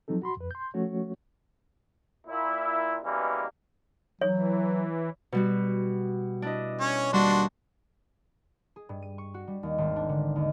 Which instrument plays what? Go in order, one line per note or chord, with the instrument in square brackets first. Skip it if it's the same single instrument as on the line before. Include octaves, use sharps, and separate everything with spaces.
[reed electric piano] F3 F#3 C4 D#4 A4
F#4 B5 C6
F2 B4
C6 G6
F3 A3 C#4 F#4 C#5
[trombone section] A#2 E4
B2 E3 G3 G#3 A#3 C#4
[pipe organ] E3 [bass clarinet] F#3 [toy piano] C#5
[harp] B2 G3 F#4
D4 E4 D#5
[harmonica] C#4 C#5
[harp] D#2 G3 A5 [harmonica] D4 F#4 C6
[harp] G#4
G2
D#7
C#6
F#4
G3
D#2
G#1
D4
D3
D#2